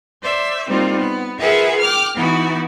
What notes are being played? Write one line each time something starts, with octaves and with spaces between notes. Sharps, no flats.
C5 D5 E5
G3 A#3 C4 D#4 F4
B3
F4 G#4 A#4 B4 E5 F#5
G5 D6 F6
E3 B3 D#4 E4 F#4